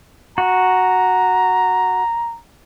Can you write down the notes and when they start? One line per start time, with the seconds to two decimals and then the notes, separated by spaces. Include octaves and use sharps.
0.38 F#4 A#5